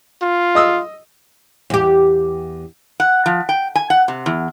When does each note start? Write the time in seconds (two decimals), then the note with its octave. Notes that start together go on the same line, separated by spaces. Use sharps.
0.22 F4
0.55 D#5 D#6 E6
1.70 E2 G4
3.00 F#5
3.26 F3
3.49 G5
3.75 G#5
3.90 F#5
4.08 C3
4.26 E2